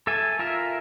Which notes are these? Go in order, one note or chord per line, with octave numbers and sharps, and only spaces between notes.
A4 E5 G#5
F4 A#4 E5